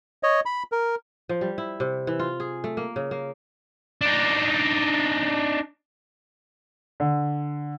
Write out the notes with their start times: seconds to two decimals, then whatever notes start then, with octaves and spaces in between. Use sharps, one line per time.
0.23 C#5 D#5
0.46 B5
0.72 A#4
1.29 F3
1.41 G3
1.58 E4
1.80 C3
2.07 E3
2.20 F4
2.40 G#4
2.64 A3
2.77 A#3
2.96 C#3
3.11 A#3
4.01 D4 D#4
7.00 D3